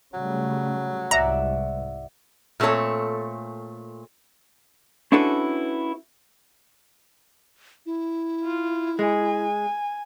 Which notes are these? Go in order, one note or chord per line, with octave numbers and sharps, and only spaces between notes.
C#3 F#3 G3 A3
C2 G#2 D5 E5 F#5 A#5
A#2 A3 C4 A4 C#5
C#4 D4 E4 F#4 A4 B4
E4
F4
G#3 G#5